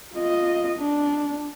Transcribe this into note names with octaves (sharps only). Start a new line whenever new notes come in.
F4 D#5
D4